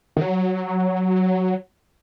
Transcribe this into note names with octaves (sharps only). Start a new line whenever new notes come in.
D#3
F#3